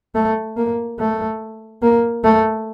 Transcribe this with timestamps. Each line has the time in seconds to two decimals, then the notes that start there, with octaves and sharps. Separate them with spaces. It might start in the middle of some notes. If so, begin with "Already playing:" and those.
0.15 A3
0.57 A#3
0.99 A3
1.82 A#3
2.24 A3